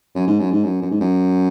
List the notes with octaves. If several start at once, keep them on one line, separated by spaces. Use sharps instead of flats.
F#2
G#2
F#2
G#2
F#2
F#2
G#2
F#2